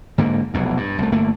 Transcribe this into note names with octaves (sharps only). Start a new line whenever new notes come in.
G#2 D3 A#3
F1 B1 E2
G2
C2 A3
G1 A3 A#3